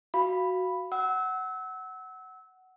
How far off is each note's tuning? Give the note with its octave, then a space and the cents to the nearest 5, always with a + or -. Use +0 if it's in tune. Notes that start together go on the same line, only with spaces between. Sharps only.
F#4 +0 F5 -10 B5 +0
F#5 +10 E6 -25